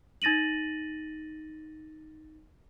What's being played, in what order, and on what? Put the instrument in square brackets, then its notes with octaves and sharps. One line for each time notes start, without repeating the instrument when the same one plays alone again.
[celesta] D#4 A6 A#6 D#7 F#7